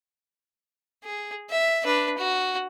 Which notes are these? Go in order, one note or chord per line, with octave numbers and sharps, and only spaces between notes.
G#4
E5
D4 B4
F#4